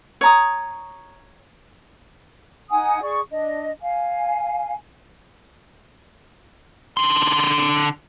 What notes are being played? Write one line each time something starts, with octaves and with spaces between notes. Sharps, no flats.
C#5 A#5 D#6
D#4 F#5 G#5 D#6
G#4 D5 C#6
D4 D#5
F5 G#5
D3 C6